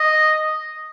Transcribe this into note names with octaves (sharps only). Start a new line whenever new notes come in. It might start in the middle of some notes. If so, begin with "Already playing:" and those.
Already playing: D#5